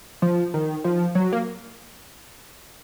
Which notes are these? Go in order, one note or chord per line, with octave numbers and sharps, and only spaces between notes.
F3
D#3
F3
F#3
A#3